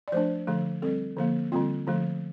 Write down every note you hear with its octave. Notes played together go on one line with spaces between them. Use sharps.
D5
F3 A3 D4 C5
D3 F3 A3
G3 C4 A4
D3 F3 A#3
D3 G3 C4 F4
D3 F3 A3